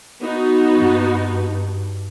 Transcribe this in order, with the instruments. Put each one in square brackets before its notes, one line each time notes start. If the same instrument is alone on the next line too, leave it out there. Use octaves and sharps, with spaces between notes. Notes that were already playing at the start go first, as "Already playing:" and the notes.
[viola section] B3 D#4 F#4
[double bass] G2